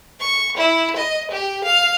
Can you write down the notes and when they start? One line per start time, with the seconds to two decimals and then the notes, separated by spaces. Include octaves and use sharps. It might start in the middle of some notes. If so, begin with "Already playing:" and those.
0.20 C#6
0.57 E4
0.96 D#5
1.31 G4
1.64 F5